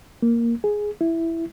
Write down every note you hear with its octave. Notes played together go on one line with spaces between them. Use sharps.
A#3
G#4
E4